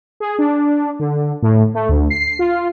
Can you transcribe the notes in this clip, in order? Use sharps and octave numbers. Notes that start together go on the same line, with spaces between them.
G#4
D4
D3
A2
A3
D2
C7
F4